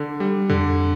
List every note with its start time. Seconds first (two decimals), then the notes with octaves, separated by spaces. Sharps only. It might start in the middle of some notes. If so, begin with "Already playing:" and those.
Already playing: D3
0.20 G3
0.49 F2 D3